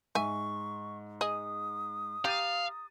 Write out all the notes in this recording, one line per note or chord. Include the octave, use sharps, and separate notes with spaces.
G#2 E5 G#5 C#6
G#4 D#5 D#6
G4 F5 A#5 A6 D#7